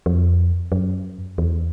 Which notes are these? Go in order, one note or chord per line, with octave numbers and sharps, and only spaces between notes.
F2
F#2
E2